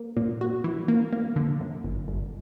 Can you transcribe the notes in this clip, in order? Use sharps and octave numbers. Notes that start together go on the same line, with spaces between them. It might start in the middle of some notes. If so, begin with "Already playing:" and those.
Already playing: A#3
A#2
F#4
E3
A#3
A#3
D3
F#2
G1
G1